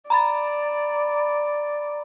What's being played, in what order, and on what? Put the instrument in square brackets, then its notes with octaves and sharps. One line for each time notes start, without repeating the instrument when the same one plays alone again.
[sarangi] D5 [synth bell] A#5 B5 A6